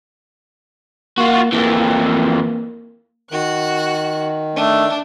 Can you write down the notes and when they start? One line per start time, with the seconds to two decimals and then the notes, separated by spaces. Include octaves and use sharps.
1.18 A#3 F4 F#4
1.53 F2 E3 A#3
3.32 D#3 F#4 F#6
4.56 A3 D4